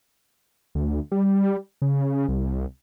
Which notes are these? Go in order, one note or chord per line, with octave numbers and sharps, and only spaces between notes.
D2
G3
C#3
C2